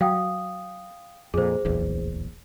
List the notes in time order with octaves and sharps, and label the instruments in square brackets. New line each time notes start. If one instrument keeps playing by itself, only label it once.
[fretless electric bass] F#3 [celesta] F5 G5 D#6
[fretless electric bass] F2 A#2 [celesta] G#4 C5
[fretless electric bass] D1 A#1 E2